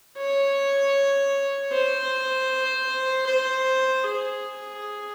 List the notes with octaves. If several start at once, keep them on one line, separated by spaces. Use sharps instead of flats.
C#5
C5
C5
G#4